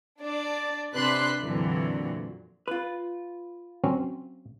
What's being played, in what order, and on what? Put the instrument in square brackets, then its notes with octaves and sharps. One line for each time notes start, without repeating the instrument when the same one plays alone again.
[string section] D4 D5
C3 D4 B4 C6 F#6 B6
F2 A#2 D3 E3 F#3
[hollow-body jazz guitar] F4 B4
[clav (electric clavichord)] F#3 C4 C#4